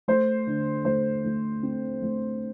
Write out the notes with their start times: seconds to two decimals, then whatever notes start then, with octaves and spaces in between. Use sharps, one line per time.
0.08 A3 C5
0.47 D3
0.85 A3 C5
1.25 A3
1.63 C4
2.02 A3